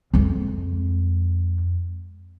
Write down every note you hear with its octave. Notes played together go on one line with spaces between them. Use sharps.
F2 G#3